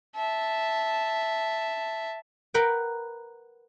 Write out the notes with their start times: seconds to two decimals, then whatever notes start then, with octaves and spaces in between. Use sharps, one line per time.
0.16 E5 A5
2.54 A#4 B4 F#5 G5